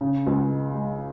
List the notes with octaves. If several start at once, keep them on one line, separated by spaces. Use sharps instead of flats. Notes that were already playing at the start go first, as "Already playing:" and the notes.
C#3
C#2
G#3
G#3